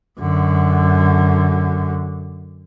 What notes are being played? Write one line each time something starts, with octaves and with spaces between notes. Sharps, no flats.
F#2 D3